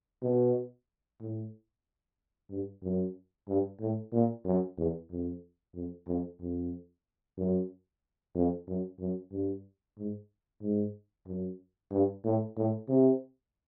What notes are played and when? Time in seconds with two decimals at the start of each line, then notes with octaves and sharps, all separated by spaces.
0.22 B2
1.20 A2
2.50 G2
2.83 F#2
3.48 G2
3.80 A2
4.12 A#2
4.45 F#2
4.77 E2
5.10 F2
5.74 F2
6.07 F2
6.40 F2
7.37 F#2
8.35 F2
8.67 F#2
8.99 F#2
9.31 G2
9.97 G#2
10.62 G#2
11.26 F#2
11.91 G2
12.24 A2
12.57 A2
12.89 C3